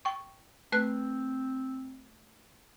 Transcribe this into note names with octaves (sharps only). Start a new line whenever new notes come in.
G5 C#6
A3 C4 B4 F#6